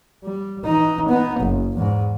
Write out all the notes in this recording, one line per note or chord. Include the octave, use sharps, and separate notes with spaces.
G3
E3 D#4
B3 D#4
F#1
E2 G#2